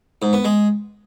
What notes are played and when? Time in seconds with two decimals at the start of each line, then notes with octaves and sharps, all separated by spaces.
0.22 G#2
0.33 B3
0.44 G#3